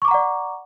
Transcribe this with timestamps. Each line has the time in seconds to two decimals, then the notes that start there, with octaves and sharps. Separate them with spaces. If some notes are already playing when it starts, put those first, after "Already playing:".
0.02 C#6
0.05 D6
0.08 A#5
0.11 F#5
0.14 D5